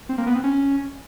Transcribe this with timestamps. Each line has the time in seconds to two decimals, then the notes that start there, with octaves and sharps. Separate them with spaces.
0.09 C4
0.18 A#3
0.27 B3
0.35 C4
0.44 C#4